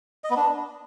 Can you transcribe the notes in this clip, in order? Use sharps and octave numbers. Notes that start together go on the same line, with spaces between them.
D#5
B3
D4